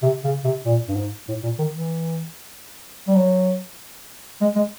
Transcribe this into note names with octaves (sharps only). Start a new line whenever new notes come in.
C3
C#3
C3
A#2
G2
G#2
A2
A#2
D#3
E3
G3
F#3
G#3
G#3